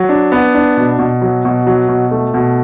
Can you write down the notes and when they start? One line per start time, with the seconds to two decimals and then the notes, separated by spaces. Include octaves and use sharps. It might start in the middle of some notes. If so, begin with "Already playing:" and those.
Already playing: F#3
0.09 D4
0.32 B3
0.54 D4
0.77 B2
0.99 B2
1.22 F#3
1.45 B2
1.67 F#3
1.89 B2
2.11 A3
2.34 B2